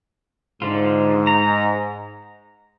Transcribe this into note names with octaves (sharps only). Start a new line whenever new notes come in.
G#2 D3 F4
A#5